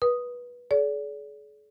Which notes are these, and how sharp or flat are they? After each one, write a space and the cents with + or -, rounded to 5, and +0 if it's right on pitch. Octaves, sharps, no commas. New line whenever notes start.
B4 -20 D#6 +0
G#4 +45 D5 -35